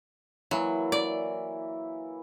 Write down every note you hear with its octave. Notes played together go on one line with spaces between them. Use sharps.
E3 F#3 A#3 E4
D5